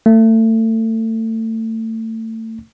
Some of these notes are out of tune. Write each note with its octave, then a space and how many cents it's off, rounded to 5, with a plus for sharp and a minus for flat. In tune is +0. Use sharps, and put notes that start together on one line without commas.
A3 +30